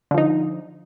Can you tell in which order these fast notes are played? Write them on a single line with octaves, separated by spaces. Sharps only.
D3 F3 D#4